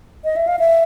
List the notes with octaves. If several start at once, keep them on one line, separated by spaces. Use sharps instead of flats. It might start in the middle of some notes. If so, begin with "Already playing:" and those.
D#5
E5
F5
E5